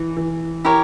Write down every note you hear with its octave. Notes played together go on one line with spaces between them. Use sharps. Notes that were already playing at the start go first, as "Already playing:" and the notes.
Already playing: E3
E3
E4 G4 A#4 C#5